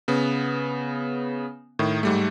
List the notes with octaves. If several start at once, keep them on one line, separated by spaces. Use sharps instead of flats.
C#3 B3
A2 D#3
G#2 G3 A3